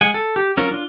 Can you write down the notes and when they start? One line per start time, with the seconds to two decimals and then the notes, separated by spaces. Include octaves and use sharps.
0.01 G#3 F#5 G#5
0.14 A4
0.36 G4
0.57 F#3 C#4 F4 A#4
0.71 D4 F4